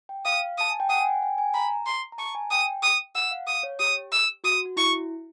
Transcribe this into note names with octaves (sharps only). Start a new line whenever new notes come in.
G5
F5 D#6
A5 D#6
G#5
G5
F#5 D#6
G#5
G5
G#5
A#5 B5
C6
A#5
A5 C#6
G#5
G5 D#6
D#6
F#5 E6
F5
D#6
C#5
G4 D#6
E6
F#4 D#6
F#4
E4 C#6